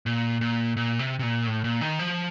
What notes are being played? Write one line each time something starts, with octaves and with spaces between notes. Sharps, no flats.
A#2
A#2
A#2
C3
C3
A#2
A2
A#2
D#3
F3